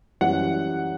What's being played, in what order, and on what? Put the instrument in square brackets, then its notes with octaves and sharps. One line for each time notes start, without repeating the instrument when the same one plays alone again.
[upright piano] F#2 E3 G3 F#5